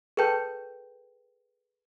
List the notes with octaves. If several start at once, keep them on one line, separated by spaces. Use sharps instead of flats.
G#4 A4 B4 G5 A5 G6